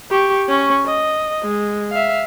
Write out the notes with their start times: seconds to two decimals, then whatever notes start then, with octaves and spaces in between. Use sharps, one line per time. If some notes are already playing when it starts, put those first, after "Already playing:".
0.10 G4 C#6
0.48 C#4 C#6
0.86 D#5
1.42 G#3
1.91 E5 F5